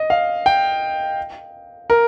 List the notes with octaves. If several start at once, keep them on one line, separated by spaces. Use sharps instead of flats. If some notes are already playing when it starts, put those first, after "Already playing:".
Already playing: D#5
F5
G5
A#4